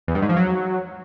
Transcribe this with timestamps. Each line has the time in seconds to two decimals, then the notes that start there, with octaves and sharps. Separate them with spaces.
0.08 E2
0.15 G2
0.22 G#2
0.29 F3
0.36 F#3